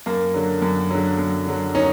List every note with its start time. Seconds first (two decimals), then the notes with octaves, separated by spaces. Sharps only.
0.06 F#2 A#3
0.34 D3 F#3
0.62 F#2
0.90 D3 F#3
1.18 F#2
1.47 D3 F#3
1.75 C#4 D#4